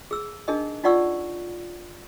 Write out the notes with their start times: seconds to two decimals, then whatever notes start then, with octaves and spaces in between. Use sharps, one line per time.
0.11 G#4 E6
0.48 D4 D#4 G#4 A#4 D#5
0.84 D#4 F4 D5 F#5 C#6 E6